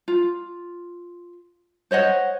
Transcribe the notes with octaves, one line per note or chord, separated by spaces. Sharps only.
F4
C5 C#5 D#5 F#5